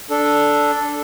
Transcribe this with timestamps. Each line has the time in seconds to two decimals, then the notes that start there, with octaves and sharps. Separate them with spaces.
0.10 D4 A4